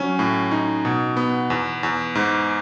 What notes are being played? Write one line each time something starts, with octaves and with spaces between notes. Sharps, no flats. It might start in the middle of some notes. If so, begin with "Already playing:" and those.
Already playing: F#3 C#4
A2
D#4
B2
B3
E2
E2
G#2